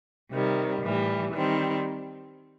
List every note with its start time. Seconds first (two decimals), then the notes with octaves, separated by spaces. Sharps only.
0.31 C3 D#3 G3
0.82 A2 E3 G3
1.33 D#3 G3 C4